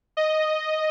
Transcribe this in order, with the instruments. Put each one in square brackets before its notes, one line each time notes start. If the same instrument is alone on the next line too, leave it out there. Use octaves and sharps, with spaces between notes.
[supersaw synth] D#5